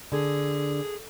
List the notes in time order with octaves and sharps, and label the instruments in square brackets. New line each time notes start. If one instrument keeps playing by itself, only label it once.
[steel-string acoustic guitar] D3 [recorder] G#4